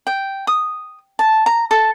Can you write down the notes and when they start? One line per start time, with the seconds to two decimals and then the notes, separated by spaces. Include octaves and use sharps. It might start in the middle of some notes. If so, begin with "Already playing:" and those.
0.07 G5
0.47 D#6
1.19 A5
1.46 A#5
1.71 A4